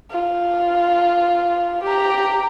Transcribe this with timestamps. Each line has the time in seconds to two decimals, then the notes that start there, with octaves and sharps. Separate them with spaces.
0.11 F4
1.84 G4 A#5